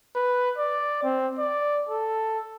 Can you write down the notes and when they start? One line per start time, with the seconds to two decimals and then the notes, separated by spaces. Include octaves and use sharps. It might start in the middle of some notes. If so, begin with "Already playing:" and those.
0.16 B4
0.58 D5
1.04 C4
1.39 D5
1.89 A4